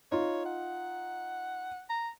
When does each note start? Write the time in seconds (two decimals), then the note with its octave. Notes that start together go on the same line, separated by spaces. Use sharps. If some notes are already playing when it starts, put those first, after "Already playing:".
0.12 D#4 F4 C#5
0.46 F#5
1.90 A#5